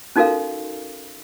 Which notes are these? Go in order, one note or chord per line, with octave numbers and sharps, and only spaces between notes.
C#4 D#4 F#4 A4 A#4 F5